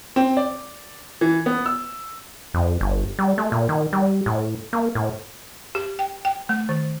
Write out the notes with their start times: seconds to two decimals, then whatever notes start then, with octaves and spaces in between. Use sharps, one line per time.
0.16 C4
0.37 D5
1.21 E3
1.46 B3
1.66 E6
2.54 F2
2.81 G1
3.19 G3
3.38 A3
3.52 A#2
3.69 D#3
3.93 G3
4.26 A2
4.73 A#3
4.95 A2
5.75 G4
5.99 G5
6.25 G5
6.49 A3
6.69 D#3